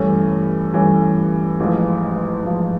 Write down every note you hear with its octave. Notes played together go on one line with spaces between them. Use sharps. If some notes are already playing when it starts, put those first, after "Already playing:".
Already playing: G2 E3 A3 C#4
G2 E3 A3 C#4
A1 G#2 F3
A1 G#2 F3